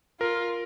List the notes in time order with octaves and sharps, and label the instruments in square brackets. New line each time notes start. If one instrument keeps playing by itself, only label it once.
[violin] F4 [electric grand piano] A#4